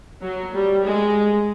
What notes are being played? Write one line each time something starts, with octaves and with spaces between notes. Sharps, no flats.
F#3
G3
G#3